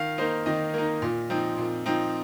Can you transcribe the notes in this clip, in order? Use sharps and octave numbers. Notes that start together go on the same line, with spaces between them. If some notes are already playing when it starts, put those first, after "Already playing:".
Already playing: D#3 F5
A#3 D#4 C5
D#3 D#5
A#3 D#4
A#2
F3 C4 D#4
A#2
F3 C4 D#4